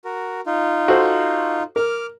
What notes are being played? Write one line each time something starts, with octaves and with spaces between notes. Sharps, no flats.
F#4 A#4
D#4 F4
F#4 A4 C5
A#4 D6 F6